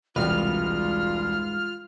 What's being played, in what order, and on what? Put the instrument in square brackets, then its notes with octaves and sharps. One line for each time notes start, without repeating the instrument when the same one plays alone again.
[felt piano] E1 C2 [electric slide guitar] G#2 G#3 B4 [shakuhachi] F4 [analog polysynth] F6